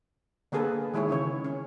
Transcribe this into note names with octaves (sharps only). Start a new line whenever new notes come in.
D3 A#3 B3 G#4 A4 B4
D#3 G#3 E4 G#4 C#5
C#3 E3 C#4 C#5
C#4